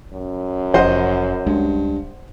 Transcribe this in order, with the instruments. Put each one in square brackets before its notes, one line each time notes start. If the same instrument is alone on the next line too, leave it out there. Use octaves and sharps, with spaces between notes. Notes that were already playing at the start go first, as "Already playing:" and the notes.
[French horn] F#2
[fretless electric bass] F1 F3 [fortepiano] C5 D#5 F#5
[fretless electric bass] C#2 G#3 D4 [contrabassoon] G2